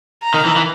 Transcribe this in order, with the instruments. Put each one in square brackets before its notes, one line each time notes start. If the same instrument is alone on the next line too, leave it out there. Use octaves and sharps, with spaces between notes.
[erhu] A#5
[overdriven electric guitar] D#3
E3
E3